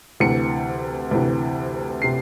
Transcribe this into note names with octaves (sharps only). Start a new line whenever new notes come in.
D2 C3 E3 C#7
D2 C3 E3
C3 C7